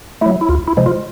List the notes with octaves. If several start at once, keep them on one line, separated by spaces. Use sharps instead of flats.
F#3 A3 E4
E4
D2 F4
E4
C3 F3 G#3
F4